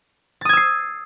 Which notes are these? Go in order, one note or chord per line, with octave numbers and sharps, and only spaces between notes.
D#6 E6 G#6 A6 C7